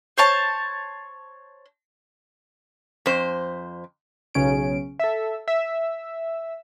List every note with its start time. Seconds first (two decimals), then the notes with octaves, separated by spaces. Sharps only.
0.18 C5 C#5 A5
3.06 F2 C5
4.34 B1 C#3 C#4 D7
5.00 A4 E5
5.48 E5